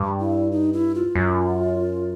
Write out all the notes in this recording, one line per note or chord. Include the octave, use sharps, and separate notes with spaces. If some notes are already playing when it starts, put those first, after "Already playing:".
Already playing: G2
E4
D#4
E4
F4
F#2